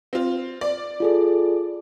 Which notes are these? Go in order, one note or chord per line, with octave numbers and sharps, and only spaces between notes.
C4 F4
D5
F4 G#4 A4